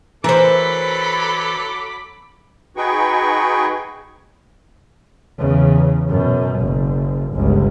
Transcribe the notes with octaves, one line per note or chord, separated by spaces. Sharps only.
E3 F#3 A4 A#4 C5 B5 D6
D#4 F#4 G#4 B4 G5 C#6
E2 C#3
F#2 B2
F#1
G1 C#2